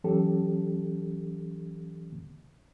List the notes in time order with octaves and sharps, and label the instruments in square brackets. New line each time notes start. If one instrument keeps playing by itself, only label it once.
[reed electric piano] E3 F#3 C#4 G4 A4